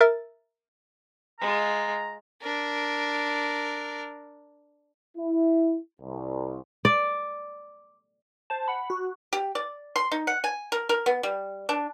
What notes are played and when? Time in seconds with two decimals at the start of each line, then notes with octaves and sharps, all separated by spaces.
0.01 A#4 E5 A6
1.40 G#3 F4 A#5
2.42 D4 A#4
5.17 E4
6.01 C2
6.85 D5
8.50 C5 A5
8.68 F#5 B5
8.90 F#4
9.33 G4
9.55 D5
9.96 C6
10.12 D#4
10.27 F#5
10.44 G#5
10.72 A#4
10.89 A#4
11.06 B3
11.23 G3
11.69 D4